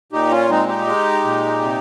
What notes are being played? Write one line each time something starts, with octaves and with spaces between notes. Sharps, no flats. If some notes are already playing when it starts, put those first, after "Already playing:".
A#2 D#4 G4
C#4 F4
G#3 C4 D#4
D#4 G4
G#3
A#2
C3